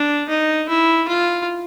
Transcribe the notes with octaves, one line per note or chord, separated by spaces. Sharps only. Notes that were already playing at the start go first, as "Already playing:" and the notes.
Already playing: D4
D#4
E4
F4